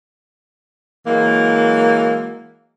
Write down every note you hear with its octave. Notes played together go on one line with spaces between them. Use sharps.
E3 F#3 G#3 A#3